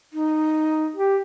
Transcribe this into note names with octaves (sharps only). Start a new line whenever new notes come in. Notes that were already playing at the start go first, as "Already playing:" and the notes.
D#4
G4